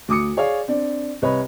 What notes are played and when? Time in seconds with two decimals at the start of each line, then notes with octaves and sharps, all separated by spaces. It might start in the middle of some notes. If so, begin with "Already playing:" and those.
0.08 D2 D6 D#6 C#7
0.37 G#4 C#5 D5 F5
0.68 C4 D4 D5
1.22 C2 B4 C#5 D#5 B5